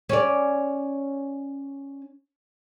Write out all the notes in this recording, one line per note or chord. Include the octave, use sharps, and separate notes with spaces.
C#4 D5